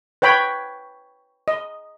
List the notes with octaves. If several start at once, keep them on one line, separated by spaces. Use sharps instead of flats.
B4 C#5 G5 B5
D#5